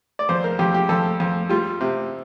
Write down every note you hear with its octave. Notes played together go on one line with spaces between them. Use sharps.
D5
F2 C5
A#4
F2 G4
G4
F2 A4
F2
G3 F4
C3